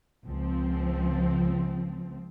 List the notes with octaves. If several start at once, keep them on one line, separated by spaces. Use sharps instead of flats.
C#2 F3 C4